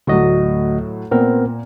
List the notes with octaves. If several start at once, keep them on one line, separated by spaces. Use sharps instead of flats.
D2 A2 F#3 F#4 D#5
A#2 B3 C4 A#4